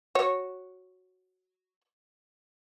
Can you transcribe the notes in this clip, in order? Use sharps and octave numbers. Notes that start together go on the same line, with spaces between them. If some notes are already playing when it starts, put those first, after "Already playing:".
F#4 C#5